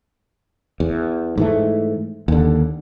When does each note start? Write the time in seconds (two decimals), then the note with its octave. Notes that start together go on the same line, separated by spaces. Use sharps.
0.80 E2
1.38 G#2 E3 A3
2.28 D#2 D3